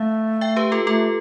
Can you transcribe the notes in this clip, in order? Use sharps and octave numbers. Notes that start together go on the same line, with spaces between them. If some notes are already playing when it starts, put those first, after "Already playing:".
Already playing: A3 F5
E5 G5
G4 B4
F4 A4
A3 F4 A4